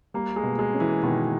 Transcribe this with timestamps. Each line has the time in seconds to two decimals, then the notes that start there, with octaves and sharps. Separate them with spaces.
0.14 G3 A#3
0.36 G#3
0.43 B2
0.59 G#3
0.74 C#4
0.80 E3
1.03 B2 D#3